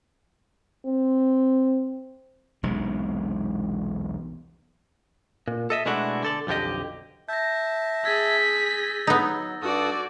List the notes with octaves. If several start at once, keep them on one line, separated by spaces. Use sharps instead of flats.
C4
E1 B1 C3 G#3
A#2
A4 D#5 E5
B2 G#3 A3 D4 E4 F#4
D3 A4 D5
B1 F2 D3 G4 D#5
E5 A5 G6 A#6
G#4 E6 G#6 A6 B6
F#3 B3 D#4
G2 F#4 A4 D5 D#6